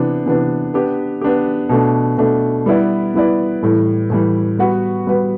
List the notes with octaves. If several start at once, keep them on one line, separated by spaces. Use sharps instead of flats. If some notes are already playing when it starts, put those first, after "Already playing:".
Already playing: C3 E3 B3 D4
C3 E3 B3 D4
B3 D4 G4
B3 D4 G4
B2 A3 D4
B2 A3 D4
G3 B3 E4 B4 D5
G3 B3 E4 B4 D5
A2 E3 G3
A2 E3 G3
G3 B3 F#4 B4
G3 B3 F#4 B4